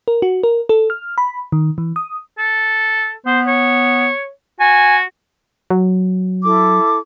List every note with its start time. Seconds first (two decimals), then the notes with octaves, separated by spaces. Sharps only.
0.08 A#4
0.22 F#4
0.43 A#4
0.69 A4
0.90 F6
1.18 B5
1.52 D#3
1.78 E3
1.96 D#6
2.38 A4
3.26 B3 C5
3.47 C#5
4.60 F#4 G#5
5.70 F#3
6.43 E4 A4 D6